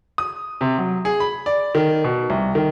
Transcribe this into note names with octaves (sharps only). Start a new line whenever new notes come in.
D#6
C3
F#3
G#4
B5
D5
D#3
B2
C2
D#3